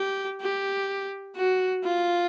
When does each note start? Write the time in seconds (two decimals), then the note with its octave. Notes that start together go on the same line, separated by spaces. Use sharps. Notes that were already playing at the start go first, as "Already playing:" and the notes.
Already playing: G4
0.40 G4
1.36 F#4
1.84 F4